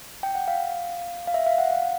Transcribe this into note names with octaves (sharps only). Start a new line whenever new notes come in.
G5
F#5
F5
F5
E5
F5
F#5
F5